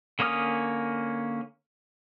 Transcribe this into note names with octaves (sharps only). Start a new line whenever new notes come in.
D3 A#3 C#4 D#6 F6